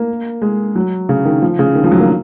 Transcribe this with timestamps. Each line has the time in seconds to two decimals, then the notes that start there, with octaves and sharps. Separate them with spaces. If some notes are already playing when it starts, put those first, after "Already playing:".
Already playing: A#3
0.42 G#3
0.75 F#3
1.09 C#3
1.25 D#3
1.42 F3
1.59 C#3
1.75 D#3
1.84 F3
1.92 F#3
2.00 A#3